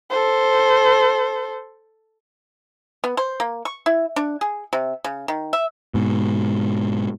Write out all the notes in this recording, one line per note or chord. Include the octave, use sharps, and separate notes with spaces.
A4 C5
B3
C5
A#3
C#6
E4
D4
G#4
C3
C#3
D#3
E5
G#2 B2